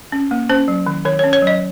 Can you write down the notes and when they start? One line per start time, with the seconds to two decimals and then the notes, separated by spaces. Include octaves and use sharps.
0.12 C#4
0.31 A#3
0.49 C#4 C5
0.68 F#3
0.86 D#3
1.05 D#3 C#5
1.19 C#4 C#5
1.33 C#5
1.42 F#3 D#5